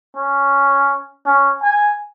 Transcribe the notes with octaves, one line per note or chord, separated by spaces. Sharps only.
C#4
C#4
G#5